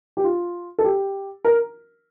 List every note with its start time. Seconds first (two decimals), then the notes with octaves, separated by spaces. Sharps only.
0.17 G4
0.24 F4
0.78 A4
0.84 G4
1.45 A#4